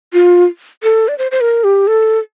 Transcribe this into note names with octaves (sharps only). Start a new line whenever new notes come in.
F4
A4
D5
C5
C5
A#4
G4
A4